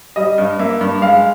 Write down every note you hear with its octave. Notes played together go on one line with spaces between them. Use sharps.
G3 D#5
G2
A#3 E5
G2
G#3 F5